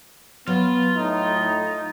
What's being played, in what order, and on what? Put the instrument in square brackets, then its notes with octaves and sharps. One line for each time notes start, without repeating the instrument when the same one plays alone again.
[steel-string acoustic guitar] F#3 [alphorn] B3 [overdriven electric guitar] F4
[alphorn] A2 [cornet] D#4